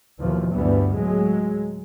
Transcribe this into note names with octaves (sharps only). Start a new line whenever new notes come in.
D#2 B2 E3 F3
D2 G2 E3 G3 B3
A2 F#3 G#3